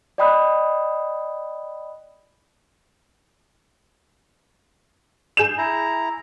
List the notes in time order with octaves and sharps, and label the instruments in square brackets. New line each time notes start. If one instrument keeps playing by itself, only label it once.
[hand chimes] D5 D#5 G5 B5 D#6 F#6
[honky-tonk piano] G#4 G6 E7
[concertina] E4 A#5